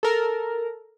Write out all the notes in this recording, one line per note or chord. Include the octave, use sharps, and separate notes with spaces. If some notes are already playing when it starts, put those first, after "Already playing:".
A4 A#4